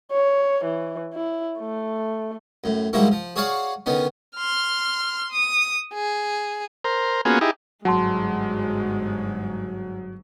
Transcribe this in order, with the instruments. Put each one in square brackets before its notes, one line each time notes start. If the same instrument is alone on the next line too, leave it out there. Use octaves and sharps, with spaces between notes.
[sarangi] C#5
E3
E4
A3
[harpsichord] F#2 A2
G#2 F3 G3 A#3 E4 F#4
F3
F#4 G#4 C#5 D5 F5 F#5
D3 D#3 B3 C#4
[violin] C6 F6
D#6
G#4
[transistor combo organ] A#4 C5
A#3 B3 C#4 F4 F#4 G#4
D#4 E4 G4 G#4
[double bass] G1 G#2 [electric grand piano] F#3 [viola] G#3 [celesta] F#5 A5 C6